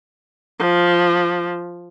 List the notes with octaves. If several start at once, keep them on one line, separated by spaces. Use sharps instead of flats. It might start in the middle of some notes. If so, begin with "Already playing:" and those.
F3